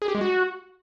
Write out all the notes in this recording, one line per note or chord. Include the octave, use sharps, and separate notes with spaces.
G#4
G4
G#3
F#4